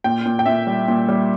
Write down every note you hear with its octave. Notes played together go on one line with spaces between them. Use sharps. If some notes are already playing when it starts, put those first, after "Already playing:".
A#2 G5
A#2
G5
A#2 E5
G3
A#2
G3